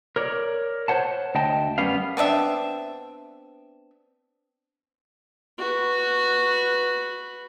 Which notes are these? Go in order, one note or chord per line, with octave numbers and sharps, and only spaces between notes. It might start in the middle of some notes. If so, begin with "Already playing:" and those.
A#4 C#5 D5
C5 C#5 F#5 A5
D2 D#5 G5 A5
F#2 G3 B3 C#4 F5
B3 C4 D4 E5
F#4 B4